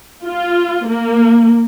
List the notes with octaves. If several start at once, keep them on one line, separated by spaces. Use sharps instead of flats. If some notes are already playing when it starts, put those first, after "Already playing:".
F4
A#3